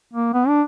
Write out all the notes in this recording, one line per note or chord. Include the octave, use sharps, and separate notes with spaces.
A#3
B3
D4